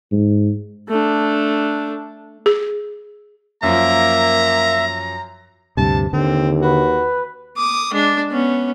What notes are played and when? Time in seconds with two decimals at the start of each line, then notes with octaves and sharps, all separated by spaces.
0.12 G#2
0.89 A3 D4
2.46 G#4
3.63 F#2 F3 A#3 E5 A#5
5.77 D2 G2 C3 A5
6.13 D#2 D3 C4
6.62 F#4 B4
7.57 D6 D#6
7.93 G#3 D4
8.32 B3 C#4